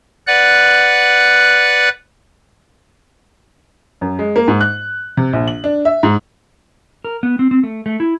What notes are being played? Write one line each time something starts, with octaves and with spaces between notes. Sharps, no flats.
B4 D5 F#5 F#6
F#2
G#3
A#3
G#2
F#6
C3
A#1
F#7
D4
E5
G#2
A#4
B3
C4
C4
A3
A3
E4